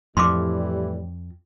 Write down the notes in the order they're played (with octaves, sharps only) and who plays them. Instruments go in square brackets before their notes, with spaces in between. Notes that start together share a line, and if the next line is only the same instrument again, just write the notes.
[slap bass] F2 [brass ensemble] A2 E3 G3 [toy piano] C6 D6